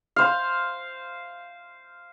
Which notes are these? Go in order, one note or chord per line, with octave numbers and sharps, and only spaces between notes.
C5 F5